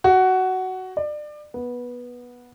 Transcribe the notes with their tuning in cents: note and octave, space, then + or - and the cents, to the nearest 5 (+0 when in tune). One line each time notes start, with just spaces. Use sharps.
F#4 +10
D5 +30
B3 -15